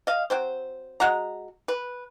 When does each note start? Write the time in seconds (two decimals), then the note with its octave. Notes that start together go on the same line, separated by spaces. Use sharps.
0.07 D#5 F5
0.30 F#3 C4 C5
1.00 G#3 F#4 F#5 A#5
1.68 B4